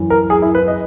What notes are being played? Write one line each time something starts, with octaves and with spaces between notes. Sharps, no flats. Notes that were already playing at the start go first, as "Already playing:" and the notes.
Already playing: F#2 E3
A#4
G#4
E4
B4
D#5